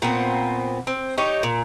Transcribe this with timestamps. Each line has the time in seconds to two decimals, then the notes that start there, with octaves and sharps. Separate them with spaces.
0.02 A#2 B3 C4
0.87 C4
1.18 D#4 G4 C#5
1.43 A#2